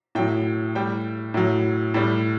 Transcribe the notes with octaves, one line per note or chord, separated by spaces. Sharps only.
A2 F#3 G5
A2 G3 G5
A2 F#3
A2 G3